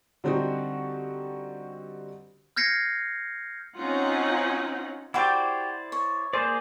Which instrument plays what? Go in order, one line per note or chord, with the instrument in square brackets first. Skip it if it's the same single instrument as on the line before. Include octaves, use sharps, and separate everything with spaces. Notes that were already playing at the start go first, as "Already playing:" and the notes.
[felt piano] D3 G3 C4 D#4 F#4
[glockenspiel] F6 G6 G#6 A#6 C7 C#7
[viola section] C4 C#4 D#4 F4 F#5
[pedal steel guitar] E4 C5 D5 [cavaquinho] F#4 G4 [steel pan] G5 D6
[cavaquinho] C#5
[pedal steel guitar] A#3 G#4 D5 [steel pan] C5